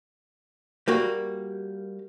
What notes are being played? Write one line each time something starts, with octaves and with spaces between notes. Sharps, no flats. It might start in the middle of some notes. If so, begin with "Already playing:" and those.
G3 A#3 F#4